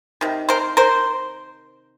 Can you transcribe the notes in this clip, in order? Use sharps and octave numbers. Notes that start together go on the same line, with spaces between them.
C3 D#3
A#4 C5
A#4 C5